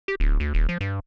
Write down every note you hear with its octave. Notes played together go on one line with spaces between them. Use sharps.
G4
D1
D2
D#1
F3
G2